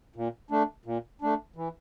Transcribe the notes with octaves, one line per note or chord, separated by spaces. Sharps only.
A#2
A3 D4
A#2
A3 D4
E3